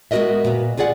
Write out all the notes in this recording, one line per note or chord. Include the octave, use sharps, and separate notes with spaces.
G#3 B3 F#4 A#4 D#5 E5
A#2 B3
F4 F#4 G#4 D5 F#5